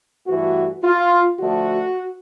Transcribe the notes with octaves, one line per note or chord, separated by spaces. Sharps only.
G2 E3 A3 F#4
F4
D3 F3 A3 F#4